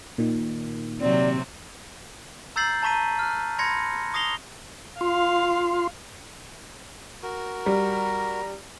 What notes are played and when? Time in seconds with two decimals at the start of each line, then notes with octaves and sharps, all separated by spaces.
0.18 A#2 D#3
1.01 C3 F#3 C4 D5
2.56 A#5 E6 G6 A6 C7 F#7
2.82 A5 A#5 C#6 B6 D#7
3.19 F6 F#6
3.59 B5 C6 G#6 A#6 C#7
4.14 C#6 D#6 A#6 C7 F7 G7
5.01 F4 F5 C6
7.23 F#4 A#4
7.66 G3 A#5